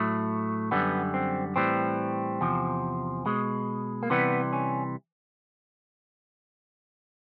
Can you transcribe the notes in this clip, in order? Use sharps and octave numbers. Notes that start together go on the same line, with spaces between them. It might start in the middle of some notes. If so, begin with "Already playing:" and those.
Already playing: A2 F#3 A3
F#2 D3 G3 B3
C4
A2 E3 G3 C4
E2 C3 F3
B2 G#3
A#3
C3 E3 G3 B3
C#4